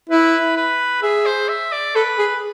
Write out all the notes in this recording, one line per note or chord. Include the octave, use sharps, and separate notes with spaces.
E4 B4
B4
G#4 E5
C5
E5
D5
A4 B4
G#4